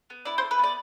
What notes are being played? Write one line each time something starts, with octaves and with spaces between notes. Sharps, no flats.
B3
E4 D5
C5
A4
B4
B3 D5